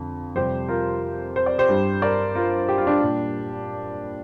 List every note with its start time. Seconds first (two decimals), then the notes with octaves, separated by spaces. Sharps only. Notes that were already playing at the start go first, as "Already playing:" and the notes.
Already playing: F2 D3
0.35 F2 C3 G3 G4 C5
0.68 F4 A#4
1.36 C5
1.46 D5
1.58 G4 C5
1.69 G2 G3
2.02 A#4 D5
2.35 F4 A#4
2.68 G4
2.78 F4
2.87 D4 G4
3.01 A#2 G3